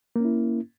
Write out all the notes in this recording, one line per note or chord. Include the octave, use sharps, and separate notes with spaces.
A#3 C#4 E4